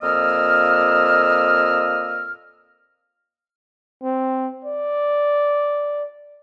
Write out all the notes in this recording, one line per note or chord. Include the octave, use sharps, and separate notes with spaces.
F2 A#2 A#3 D#5 E6 F6
C4
D5